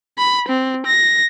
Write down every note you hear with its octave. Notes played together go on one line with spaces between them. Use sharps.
B5
C4
A#6